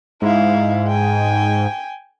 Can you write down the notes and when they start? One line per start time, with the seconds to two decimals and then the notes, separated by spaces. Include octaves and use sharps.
0.22 G#2 E4 F5
0.87 G5 G#5